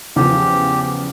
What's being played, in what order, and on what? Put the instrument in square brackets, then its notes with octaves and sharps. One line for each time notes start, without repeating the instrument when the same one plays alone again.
[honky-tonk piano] E2 C#3 F3 [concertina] G4